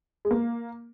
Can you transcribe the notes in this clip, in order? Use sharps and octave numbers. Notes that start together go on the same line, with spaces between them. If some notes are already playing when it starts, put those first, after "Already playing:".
G#3
A#3